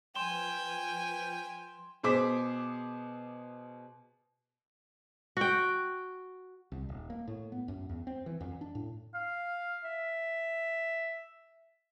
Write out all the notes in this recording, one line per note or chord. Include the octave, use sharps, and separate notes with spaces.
F3 B4 G5 G#5 C6 F6 E7 G7
B2 G#4 C5 D6 B6
F#4 G5
C2
D#1
A#3
A2
B3
F#2
E2
C4
E3
F2
D4
A2
F5
E5